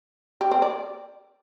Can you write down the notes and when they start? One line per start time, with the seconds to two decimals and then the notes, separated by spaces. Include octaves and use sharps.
0.41 G4
0.51 C4
0.62 D5